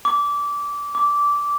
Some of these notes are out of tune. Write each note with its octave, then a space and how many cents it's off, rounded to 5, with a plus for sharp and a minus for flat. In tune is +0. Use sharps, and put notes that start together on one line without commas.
D6 -20
D6 -15